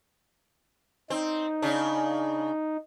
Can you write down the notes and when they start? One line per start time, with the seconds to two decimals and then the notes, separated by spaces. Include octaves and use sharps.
1.10 C4 D#4
1.62 C#3 D4